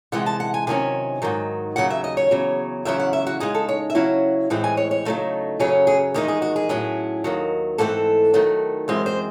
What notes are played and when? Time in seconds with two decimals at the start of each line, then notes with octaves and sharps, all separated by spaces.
0.12 C3 E3 G#3 F#5
0.26 A5
0.40 F#5
0.54 G#5
0.67 C3 D#3 F#3 C#4 G#5
1.22 G#2 D#3 F#3
1.76 D#2 C#3 F#3 F#5
1.90 E5
2.04 D#5
2.17 C#5
2.31 E2 C#3 F#3
2.85 E2 C#3 F#3 C#4 E4 E5
2.99 F#5
3.13 E5
3.27 F#4
3.40 C#3 G#3 D#4 G#4
3.55 A4
3.69 C#5
3.90 E5
3.95 C#3 F#3 C#4 E4 F#5
4.50 A2 E3 G#3 C4
4.64 G#5
4.77 C#5
4.91 C#5
5.05 C#3 F#3 A3 D#4
5.60 F#2 C#3 F#3 C#4 G#4
5.87 G#4
6.14 E2 D#3 G#3 D#4 G#4
6.28 G#4
6.42 F#4
6.56 G#4
6.69 A2 F#3 C#4 E4
7.24 D#2 D#3 F#3
7.78 G#2 E3 A3 C4 A4
8.34 D#3 F#3 A3
8.88 F#2 E3 G#3 C4 C5
9.06 C5